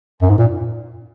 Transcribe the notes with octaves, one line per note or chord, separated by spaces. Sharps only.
F#2
G#2
A#2